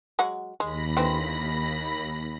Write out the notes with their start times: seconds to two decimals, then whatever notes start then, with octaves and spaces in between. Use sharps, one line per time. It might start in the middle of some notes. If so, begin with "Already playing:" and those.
0.19 F#3 G#3 F#5
0.60 D#2 G#3 B5 A#6
0.97 D3 E3 C4